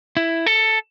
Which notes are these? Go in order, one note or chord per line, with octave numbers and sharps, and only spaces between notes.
E4
A4